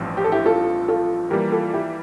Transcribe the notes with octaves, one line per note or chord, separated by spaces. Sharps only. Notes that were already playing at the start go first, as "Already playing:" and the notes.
Already playing: A1 G2 F3 C4
G4
A4
E4 G4
F4 A4
F4 A4
E3 G3 A#3 G4 A#4
F4 A4
E4 G4